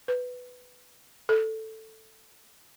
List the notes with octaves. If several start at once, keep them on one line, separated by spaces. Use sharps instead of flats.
B4
A4